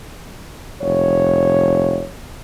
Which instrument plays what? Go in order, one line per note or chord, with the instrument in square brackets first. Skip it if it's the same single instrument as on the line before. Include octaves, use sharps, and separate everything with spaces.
[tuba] F1 [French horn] C#5